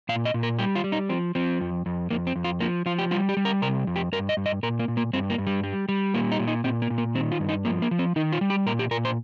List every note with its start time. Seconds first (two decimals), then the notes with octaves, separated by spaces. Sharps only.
0.09 A#2 F5
0.25 D#5
0.34 A#2
0.43 A#4
0.59 G3 G4
0.75 F4
0.84 G3
0.92 D#4
1.09 F3 C4
1.35 F3 C4
1.61 F2
1.86 F2
2.11 F2 A#3
2.27 C4
2.36 F2
2.44 F4
2.60 F3 A#3
2.86 F3 F4
2.99 G4
3.11 G3 F4
3.29 G4
3.37 G3
3.45 A#4
3.62 C3 A#4
3.87 F2
3.96 G4
4.12 G2 A#4
4.29 D#5
4.37 G2
4.46 D#5
4.63 A#2 A#4
4.79 A#3
4.88 A#2
4.97 A#3
5.13 G2 C4
5.30 A#3
5.38 G2
5.47 G3
5.64 G3
5.89 G3
6.14 A#2 A#3
6.31 D#4
6.39 A#2
6.48 D#4
6.64 A#2 C4
6.82 A#3
6.90 A#2
6.98 A#3
7.14 D#3 C4
7.32 F4
7.40 G2
7.49 D#4
7.65 F3 A#3
7.82 A#3
7.91 F3
7.99 C4
8.16 D#3 D#4
8.33 F4
8.41 G3
8.50 G4
8.66 A#2 A#4
8.79 G4
8.91 A#2 A#4
9.05 C5